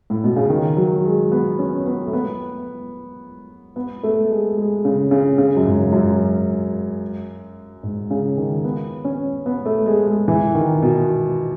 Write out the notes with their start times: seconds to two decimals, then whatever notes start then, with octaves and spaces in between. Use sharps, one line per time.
0.10 A2
0.24 B2
0.36 C#3
0.50 D#3
0.77 F#3
1.05 G#3
1.32 B3
1.59 C#4
1.86 B3
2.07 A3
2.13 B3
3.76 B3
4.03 A3
4.31 G#3
4.57 G#3
4.85 C#3
5.11 C#3
5.38 C#3
5.56 F#2
5.66 G#2
5.92 F#2
7.83 G#2
8.10 C#3
8.37 D#3
8.64 B3
9.05 C#4
9.46 B3
9.66 A3
9.86 G#3
10.07 G#3
10.28 E3
10.55 D#3
10.82 B2